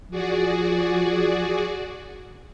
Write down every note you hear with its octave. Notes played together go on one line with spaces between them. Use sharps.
F3 F#4 G#4 D5